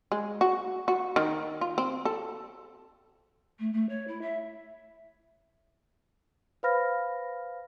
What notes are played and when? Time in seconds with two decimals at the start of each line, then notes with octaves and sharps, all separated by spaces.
0.12 G#3
0.41 F#4
0.88 F#4
1.16 D#3
1.61 F4
1.78 C4
2.05 A4
3.59 A3
3.73 A3
3.89 C#5
4.08 E4
4.22 E5
6.63 B4 C5 F5 B5 F6 A#6